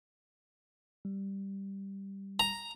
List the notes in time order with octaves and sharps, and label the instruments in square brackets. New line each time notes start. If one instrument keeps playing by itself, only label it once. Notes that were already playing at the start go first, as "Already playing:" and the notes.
[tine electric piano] G3
[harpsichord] A#5